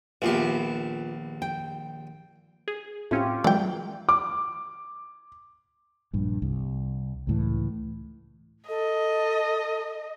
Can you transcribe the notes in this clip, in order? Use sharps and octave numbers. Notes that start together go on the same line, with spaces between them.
A#1 D#2 B3 F4 G4 E5
G5
G#4
A2 C4 C#4 F4 G4
E3 F#3 G#3 D5 G5
D6
A#1 G2
C2
C#2 A2 E3
A4 D#5